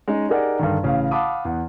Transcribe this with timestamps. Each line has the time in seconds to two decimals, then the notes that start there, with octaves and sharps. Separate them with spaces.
0.08 G#3 C#4 D#4
0.29 D#4 G4 G#4 A#4 D5 F#5
0.59 G2 D3 D#3
0.83 A1 C#3 F5
1.11 F5 F#5 A5 B5 D6 D#6
1.45 E2 F#5